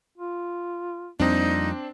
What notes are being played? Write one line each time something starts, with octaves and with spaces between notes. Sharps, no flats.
F4
F2 G3 A#3 C4 D4 D#4